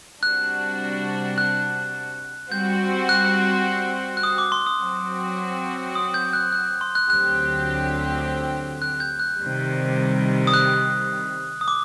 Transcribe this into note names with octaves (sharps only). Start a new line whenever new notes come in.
C3 G3 D4 F#4 F#6
F#6
G3 C4 F#4 C5 G6
F#6
F#6
D#6
D6
C6
D#6
F#3 C4 F#4
D#6
G6
F#6
F#6
C6
F#6
D2 D3 F#3 C4 G4 F#6
F#6
G6
F#6
C3 D#3 G3
D#6
F#6
D#6
D6